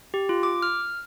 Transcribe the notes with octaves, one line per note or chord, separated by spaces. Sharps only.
G4
F4
D6
F6